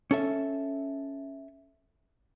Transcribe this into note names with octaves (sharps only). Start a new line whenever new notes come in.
C#4 A4 E5